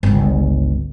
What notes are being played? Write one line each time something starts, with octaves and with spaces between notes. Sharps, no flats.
G1 C#2